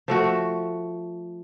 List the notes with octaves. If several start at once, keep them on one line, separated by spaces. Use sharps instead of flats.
F3 A3 F#4